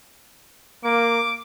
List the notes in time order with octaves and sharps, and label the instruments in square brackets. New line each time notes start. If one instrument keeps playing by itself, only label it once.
[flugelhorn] A#3 [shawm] D6